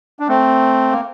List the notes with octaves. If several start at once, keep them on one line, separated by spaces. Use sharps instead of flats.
D4
A3 C4
A#3